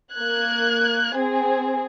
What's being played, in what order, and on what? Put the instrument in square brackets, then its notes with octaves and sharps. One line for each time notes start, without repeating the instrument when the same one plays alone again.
[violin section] A#3 F#6 G#6
C4 G#4